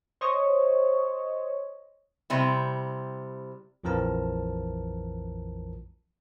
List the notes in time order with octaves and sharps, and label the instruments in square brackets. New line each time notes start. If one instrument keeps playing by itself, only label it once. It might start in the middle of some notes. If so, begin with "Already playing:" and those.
[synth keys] C5 C#5 D#5
[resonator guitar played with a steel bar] C3 G3 E4
[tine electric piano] A#1 F2 E3 F3 A#4 A5